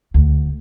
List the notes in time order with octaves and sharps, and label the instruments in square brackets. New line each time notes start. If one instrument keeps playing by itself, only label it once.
[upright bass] D2